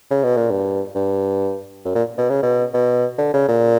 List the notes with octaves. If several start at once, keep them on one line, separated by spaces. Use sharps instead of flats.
C#3
B2
A#2
G2
G2
F#2
A#2
B2
C#3
B2
B2
D3
C#3
A#2